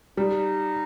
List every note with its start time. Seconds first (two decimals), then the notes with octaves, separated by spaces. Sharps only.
0.17 G3 D#4